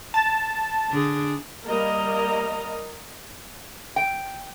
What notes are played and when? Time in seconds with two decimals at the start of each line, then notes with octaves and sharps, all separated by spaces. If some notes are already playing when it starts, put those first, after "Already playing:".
0.14 A5
0.89 D3 D4 G#4
1.65 G3 A#3 A#4 D#5 A#5
3.96 G5